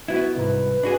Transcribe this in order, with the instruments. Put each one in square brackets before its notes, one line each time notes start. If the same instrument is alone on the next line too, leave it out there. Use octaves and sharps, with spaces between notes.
[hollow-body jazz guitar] B3 E4 [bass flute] F#4
[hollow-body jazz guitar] C2 G#2 [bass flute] B4
[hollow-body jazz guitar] D4 F#4 G#4